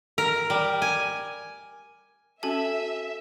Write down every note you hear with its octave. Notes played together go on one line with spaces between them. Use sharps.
A#4
G3
G#5
C#4 F#4 A4 E5 G#5 A5